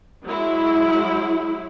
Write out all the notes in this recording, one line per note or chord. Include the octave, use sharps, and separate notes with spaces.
F#3 G#3 E4